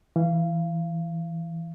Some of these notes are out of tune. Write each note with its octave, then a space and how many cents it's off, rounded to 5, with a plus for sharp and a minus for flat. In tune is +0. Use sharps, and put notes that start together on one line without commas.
E3 +0 F5 -20